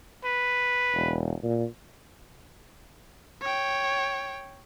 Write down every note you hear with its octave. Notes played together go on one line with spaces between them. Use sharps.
B4
E1
A#2
C#5 G5